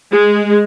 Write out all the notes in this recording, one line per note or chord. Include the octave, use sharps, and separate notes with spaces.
G#3